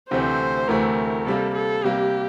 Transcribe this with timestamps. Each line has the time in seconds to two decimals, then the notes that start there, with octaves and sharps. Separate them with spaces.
0.11 D2 C3 E3 A3 C4 C5
0.68 D2 C3 E3 A3 C4 A#4
1.26 C3 G3 A#3 A4
1.55 A4
1.84 C3 G3 A#3 G4